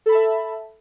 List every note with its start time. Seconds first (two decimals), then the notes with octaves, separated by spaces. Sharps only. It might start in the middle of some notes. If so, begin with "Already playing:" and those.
0.06 A4
0.09 B5
0.12 A5
0.15 E5